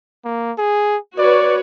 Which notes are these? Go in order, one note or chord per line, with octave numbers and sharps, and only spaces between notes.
A#3
G#4
F#4 B4 C#5 D5